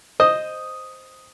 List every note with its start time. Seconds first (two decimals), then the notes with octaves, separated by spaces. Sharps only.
0.20 C5 D#5 D#6